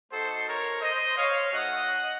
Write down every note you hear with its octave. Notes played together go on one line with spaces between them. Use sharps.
A3 D#4 F#4 A4 C5
A#4 C#5
C5 D#5
C#5 F5
A3 D#4 F#4 D#5 F#5